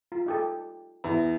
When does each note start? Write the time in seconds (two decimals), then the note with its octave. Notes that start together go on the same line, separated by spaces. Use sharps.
0.12 F4
0.26 D#4 G4 A4
1.04 E2